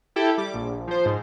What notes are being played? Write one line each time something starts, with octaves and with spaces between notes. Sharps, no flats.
E4 G4 A4 G5
G3 D6
A#1
F3 C5
G#2